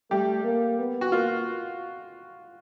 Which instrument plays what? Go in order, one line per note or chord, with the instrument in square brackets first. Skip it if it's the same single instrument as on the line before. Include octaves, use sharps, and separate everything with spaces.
[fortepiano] G3 G4 [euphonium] A3
[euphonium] A#3
B3
[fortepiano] F#4
[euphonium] A#3 [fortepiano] F4